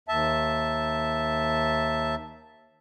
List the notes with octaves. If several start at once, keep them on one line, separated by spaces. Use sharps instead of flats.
D#2 E5 A5